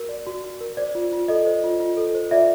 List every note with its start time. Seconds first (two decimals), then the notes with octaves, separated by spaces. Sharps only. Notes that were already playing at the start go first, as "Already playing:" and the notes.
Already playing: F#4 A#4
0.09 D5
0.27 F#4
0.44 F#4
0.61 A#4
0.77 C5 D5
0.95 F4
1.12 F4
1.28 A4 D#5
1.46 C5
1.64 F4
1.80 F4
1.97 A4
2.15 C5
2.31 F4 D5 E5